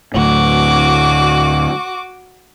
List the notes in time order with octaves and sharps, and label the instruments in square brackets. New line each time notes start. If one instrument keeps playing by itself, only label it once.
[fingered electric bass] D2 A2 [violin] F#4 D6